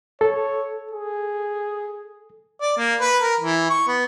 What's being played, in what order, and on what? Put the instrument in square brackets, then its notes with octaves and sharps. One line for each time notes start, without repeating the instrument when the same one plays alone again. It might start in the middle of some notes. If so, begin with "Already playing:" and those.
[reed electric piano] A4 [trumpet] C#5
[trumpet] G#4
[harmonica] D5
A#3
B4
A#4
E3
C#6
B3